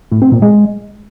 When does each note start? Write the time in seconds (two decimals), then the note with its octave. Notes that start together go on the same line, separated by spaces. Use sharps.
0.11 A2
0.22 C4
0.32 A#2
0.42 G#3